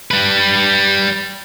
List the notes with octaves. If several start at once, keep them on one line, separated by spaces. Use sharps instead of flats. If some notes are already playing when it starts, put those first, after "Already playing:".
G3 B4